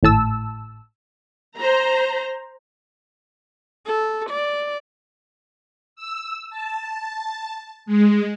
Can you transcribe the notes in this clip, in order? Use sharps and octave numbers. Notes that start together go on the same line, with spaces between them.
G#1 A2 A5 E6
C5 A#5
A4
D5
E6
A5
G#3